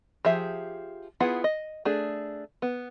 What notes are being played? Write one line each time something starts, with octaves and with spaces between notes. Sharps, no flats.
F3 G4 G#4 E5
B3 E4 F4 G#4 F#5
D#5
A3 D4 G#4
B3